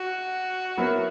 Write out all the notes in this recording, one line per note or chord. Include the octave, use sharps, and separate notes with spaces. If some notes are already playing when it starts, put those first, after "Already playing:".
Already playing: F#4
F#3 B3 E4 A#4